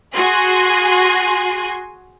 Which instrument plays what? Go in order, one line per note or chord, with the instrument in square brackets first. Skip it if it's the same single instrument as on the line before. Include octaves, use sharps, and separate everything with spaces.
[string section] F#4 G#4 G#5 C6